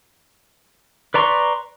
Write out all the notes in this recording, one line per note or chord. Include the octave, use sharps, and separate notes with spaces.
B4 D5 A#5 C6 C#6